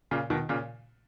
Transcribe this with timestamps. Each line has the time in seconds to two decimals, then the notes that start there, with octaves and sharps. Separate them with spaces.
0.11 A#2 C#3
0.30 B2 D#3
0.49 A#2 C#3